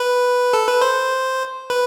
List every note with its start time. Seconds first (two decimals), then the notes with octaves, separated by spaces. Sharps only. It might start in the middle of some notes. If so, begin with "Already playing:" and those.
Already playing: B4
0.53 A4
0.68 B4
0.81 C5
1.70 B4